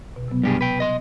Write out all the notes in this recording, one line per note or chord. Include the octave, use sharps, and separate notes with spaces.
B2
C3 F#3 B3
G2 G4 G#4
B4 G5
D#5 C6